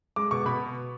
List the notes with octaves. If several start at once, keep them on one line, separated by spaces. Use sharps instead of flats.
G#3 D6
B2 C#6
B2 B5